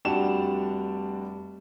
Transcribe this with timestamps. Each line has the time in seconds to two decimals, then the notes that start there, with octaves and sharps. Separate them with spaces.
0.05 F1 G3 D4 F#4 E7 F7